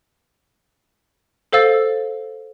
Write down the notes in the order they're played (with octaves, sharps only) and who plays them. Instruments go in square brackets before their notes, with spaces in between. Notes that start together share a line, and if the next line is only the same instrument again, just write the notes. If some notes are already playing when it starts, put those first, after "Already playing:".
[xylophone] A4 C5 F5 E6 A6